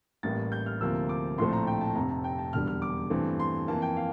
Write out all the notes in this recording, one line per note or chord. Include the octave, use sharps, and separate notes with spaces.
A1 A2 G3 A#3 A6
G6
F6
D2 C3 F3 A#3 E6
D6
A#1 A2 F3 A3 C4 C6
A#5
G5
A5
F1 F2 C3 A#5
A5
G5
A5
E1 E2 D3 G3 F6
F6
D6
G2 E3 A3 C4
C6
F2 E3 A#3 A5
G5
F5